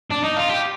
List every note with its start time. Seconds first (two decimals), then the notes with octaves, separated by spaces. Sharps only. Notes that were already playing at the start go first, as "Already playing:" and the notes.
0.11 D4
0.24 D#4
0.36 F4
0.49 G4